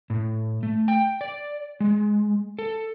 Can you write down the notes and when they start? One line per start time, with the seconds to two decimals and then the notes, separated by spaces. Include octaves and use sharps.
0.10 A2
0.63 A3
0.88 G5
1.21 D5
1.80 G#3
2.59 A4